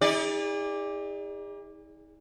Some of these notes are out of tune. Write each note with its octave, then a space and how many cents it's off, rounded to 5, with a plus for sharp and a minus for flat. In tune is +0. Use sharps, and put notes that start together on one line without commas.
D#4 +45 G#4 -40 D5 +0